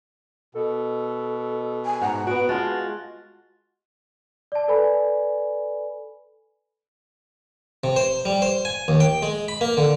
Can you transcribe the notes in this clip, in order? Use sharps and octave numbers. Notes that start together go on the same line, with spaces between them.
B2 A4
G#5
G#2 F#5 A#5
B3 F#4 D7
G#3 F4 F#4 A5 A6
D5 A5
A4 B4 D5 G#5 B5
C3
C5
G3
C5
G#5
D#2
G5
G#3
B5
A#3
D3